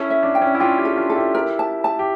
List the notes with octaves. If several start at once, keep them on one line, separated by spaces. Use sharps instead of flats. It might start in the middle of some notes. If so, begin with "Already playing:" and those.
Already playing: C#4 E4 A4
E5
D4
G5
C#4 E4
E4
D4 F4 G5
E4 G4
A4
D4 F4
A4
E4 G4
A#4
A5
A5
G4